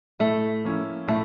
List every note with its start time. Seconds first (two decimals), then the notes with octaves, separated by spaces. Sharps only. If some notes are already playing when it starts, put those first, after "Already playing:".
0.20 A2 A3
0.64 F3 A#3 C#4 E4
1.08 A2 A3